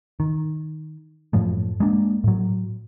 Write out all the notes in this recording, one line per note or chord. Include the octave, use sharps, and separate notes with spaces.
D#3
F#2 A2 F3 A3
G#3 A#3 D4
A2 F#3